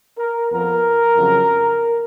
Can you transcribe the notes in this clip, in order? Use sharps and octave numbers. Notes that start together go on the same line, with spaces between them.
A#4
F2 F3 B3 A#4
F2 C#3 F#3